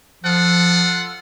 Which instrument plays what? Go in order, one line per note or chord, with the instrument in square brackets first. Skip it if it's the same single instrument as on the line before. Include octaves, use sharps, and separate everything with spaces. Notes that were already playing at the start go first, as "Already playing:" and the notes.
[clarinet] F3 [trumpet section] F4 A4 F#5